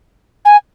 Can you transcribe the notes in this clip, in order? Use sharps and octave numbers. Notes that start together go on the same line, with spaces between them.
G#5